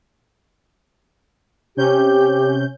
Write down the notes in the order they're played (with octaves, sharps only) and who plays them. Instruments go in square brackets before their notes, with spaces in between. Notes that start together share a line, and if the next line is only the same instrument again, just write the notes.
[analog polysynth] C3 C#4 G6 [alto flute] G4